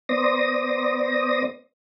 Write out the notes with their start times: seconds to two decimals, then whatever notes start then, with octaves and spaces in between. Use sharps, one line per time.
0.09 B3 C5 D5 D#6 A#6